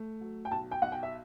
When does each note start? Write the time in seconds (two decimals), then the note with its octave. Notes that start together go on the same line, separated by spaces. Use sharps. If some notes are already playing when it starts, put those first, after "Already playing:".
Already playing: A3
0.21 F#3
0.45 G5
0.51 B1 A5
0.71 G5
0.82 B1 F#5
0.92 G5
1.03 E5